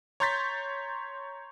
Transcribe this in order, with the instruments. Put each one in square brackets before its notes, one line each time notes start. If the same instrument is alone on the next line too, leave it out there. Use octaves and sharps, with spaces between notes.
[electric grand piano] C#5 A#5 C6 G6 A6 B6